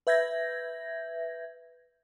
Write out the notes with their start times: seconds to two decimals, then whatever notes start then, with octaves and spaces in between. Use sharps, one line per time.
0.07 B4 E5 G6 G#6 A#6